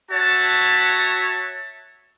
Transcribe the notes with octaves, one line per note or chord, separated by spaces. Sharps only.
F#4 C#5 E5 A5